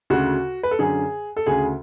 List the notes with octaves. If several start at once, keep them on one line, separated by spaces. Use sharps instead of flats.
D2 C#3 F#4
B4
A4
F#2 D3 G#4
A4
D2 C#3 G#4